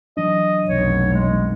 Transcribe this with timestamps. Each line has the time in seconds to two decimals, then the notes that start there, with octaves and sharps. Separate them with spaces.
0.17 E3 F#3 D4 D#5
0.67 F1 B1 C#5
1.14 G#3